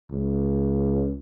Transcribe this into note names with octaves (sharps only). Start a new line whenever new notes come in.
C#2